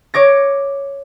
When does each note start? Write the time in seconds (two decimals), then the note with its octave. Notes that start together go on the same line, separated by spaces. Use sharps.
0.14 C#5 D6 A#6